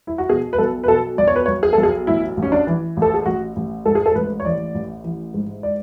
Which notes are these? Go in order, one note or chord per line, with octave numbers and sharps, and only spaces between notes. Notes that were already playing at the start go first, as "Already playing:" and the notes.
E4
F#4
B2 G#4
B4
B1 A4
B4
B2 A4
B1 D5
C#5
B4
C#5
B1
G#4
B1 A4
G#4
A1 E4
A1
C#4
D4
E3
A1
A4
G#4
A1 F#4
A1
G#2 A4
G#4
A4
A1 B4
C#5
E3 D5
A1
E3
G#2
D5